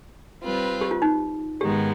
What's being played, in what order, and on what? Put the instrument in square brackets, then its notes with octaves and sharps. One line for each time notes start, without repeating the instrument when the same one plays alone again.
[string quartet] G3 C4 F4 B4
[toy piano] G4
F4
D#4
[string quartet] G#2 D#3 G#3 B3 D#4 [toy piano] G4